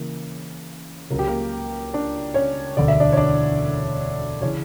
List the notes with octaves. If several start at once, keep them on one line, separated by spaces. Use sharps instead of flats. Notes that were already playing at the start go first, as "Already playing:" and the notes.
Already playing: C#3 E3 A#3
C#2 C#3 F#3 A#4
G4
A#3 A#4
D4 D5
C#4 C#5
E1 D2 D3 D5
E5
D4 D5
C#5
D4 D5
C#3 E3 C#4 C#5